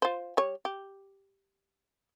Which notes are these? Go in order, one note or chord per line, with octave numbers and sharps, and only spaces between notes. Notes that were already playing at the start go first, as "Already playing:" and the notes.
F4 C5
G3 C#5
G4